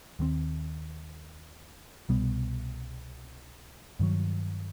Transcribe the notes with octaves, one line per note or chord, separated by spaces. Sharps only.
D#2 D#3 G3 C4
C2 B2 G3 B3
G2 D#3 F#3